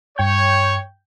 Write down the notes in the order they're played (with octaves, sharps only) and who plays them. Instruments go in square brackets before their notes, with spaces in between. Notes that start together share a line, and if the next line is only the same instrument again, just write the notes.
[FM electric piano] G2 G5 G6 [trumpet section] C#5